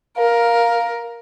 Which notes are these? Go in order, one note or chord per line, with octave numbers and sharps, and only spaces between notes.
A#4 F5